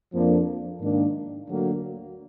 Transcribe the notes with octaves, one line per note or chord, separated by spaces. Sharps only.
F2 F3 A#3 D4
G#2 D#3 A#3 D4
D2 D3 F#3 A#3